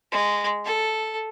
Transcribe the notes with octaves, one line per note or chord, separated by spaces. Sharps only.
G#3
A4